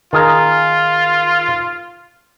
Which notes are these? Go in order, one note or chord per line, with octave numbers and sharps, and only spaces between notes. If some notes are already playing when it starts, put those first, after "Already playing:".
D#3 F4 G#4 A#4